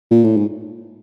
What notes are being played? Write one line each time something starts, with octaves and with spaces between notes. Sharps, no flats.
A#2
A2
G#2